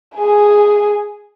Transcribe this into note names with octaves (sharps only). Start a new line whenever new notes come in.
G#4 G#5